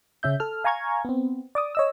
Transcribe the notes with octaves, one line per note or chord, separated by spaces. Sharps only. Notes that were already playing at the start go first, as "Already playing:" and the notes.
C#3 C#4 E5 G6
A4 F6
F5 G#5 A#5 C#6 F6 G#6
B3 C4
D5 D6 D#6
C#5 D#5 E6